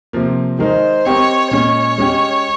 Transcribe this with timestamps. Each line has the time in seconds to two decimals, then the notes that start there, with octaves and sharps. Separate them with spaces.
0.13 C3 F3 A#3
0.59 D#3 G#3 D#4 A#4 C5
1.05 C4 G4 A#4 C#5 D#5
1.51 A#2 G#3 C#4 C#5
1.98 G#3 C#4 G4